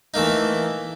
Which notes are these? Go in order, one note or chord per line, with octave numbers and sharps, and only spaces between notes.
E3 A3 A#3 D#4